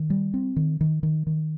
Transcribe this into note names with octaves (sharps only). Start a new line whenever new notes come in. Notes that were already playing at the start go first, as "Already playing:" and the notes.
Already playing: D#3
G3
C4
D#3
D#3
D#3
D#3